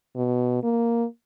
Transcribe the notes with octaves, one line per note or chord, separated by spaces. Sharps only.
B2
A#3